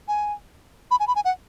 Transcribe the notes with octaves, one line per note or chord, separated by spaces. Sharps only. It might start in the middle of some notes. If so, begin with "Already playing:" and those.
G#5
B5
G#5
B5
G#5
F#5